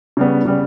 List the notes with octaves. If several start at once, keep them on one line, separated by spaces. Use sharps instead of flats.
C#3 G3 B3
C#3 G3 B3